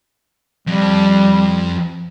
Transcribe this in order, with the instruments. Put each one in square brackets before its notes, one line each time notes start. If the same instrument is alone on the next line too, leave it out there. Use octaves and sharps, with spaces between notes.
[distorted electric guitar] F2 [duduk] G3